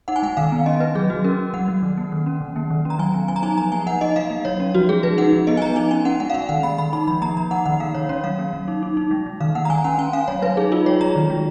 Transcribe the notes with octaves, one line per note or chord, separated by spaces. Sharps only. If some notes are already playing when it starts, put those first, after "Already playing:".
D#4 F#5
G#5
G#3 F#5
D#3 F5
B3
C#4 D#5
C#4 B4
F#3 G#4
F#3 F#4
C#4 A#4
C#4
F#3 F#5
F#3
D#3
A#3
D#3
C#4
D#3
A#3
D#3
C#4
A#5
F#3 G#5
B3
F#3 G#5
A#5
D#4 G#5
F3 A#5
A#3 G#5
F3 F#5
D#4 D#5
F#3 F5
A#3
F#3 C#5
C#4
F3 F#4
G#3 G#4
F3 B4
D#4 F#5
F3
B3 D#5
G#5
F3 A#5
D#4 G#5
C#4 G#5
C#4 F#5
G#3 F#5
F5
G#3 F#5
D#3 F#5
A#3 B5
D#3 B5
D#4 B5
F3 B5
A#3 A#5
F3 A#5
D#4 F#5
D#3 F#5
A#3 F5
D#3 C#5
C#4 C#5
F#3 F5
A#3
F#3
D#4
D#4
D#4
G#3
G#3
D#3 F5
A#3 F#5
A#5
D#3 G#5
C#4 F#5
C#4 G#5
C#4 F5
F#3 C#5
F#3 B4
D#4 G#4
D#4 F4
G#3 C#5
G#3 A#5
D#3
G#3